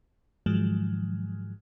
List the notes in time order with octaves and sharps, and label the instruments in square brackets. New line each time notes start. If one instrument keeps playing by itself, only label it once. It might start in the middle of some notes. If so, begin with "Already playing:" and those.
[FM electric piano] G#2 D#3 F3 F#3 G#3